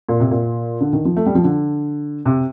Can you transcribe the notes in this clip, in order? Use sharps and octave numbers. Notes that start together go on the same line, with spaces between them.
A#2
C3
A#2
D3
D#3
F3
A3
G3
F3
D3
C3